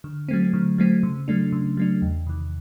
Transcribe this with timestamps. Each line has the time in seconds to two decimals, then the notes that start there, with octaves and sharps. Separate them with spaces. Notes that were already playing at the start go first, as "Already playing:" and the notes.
0.04 D3
0.29 F#3 A3 C4
0.53 D3
0.78 F#3 A3 C4
1.03 C#3
1.28 F#3 A3 D4
1.52 C#3
1.77 F#3 A3 D4
2.02 E2
2.27 C3 D#3